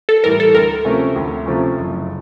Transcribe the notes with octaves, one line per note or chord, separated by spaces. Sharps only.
A4
A2 E3 G3 A#4
A4
D2 A#4
C3 F3 A3 C#4
D2
C3 F3 A3 C#4
F#1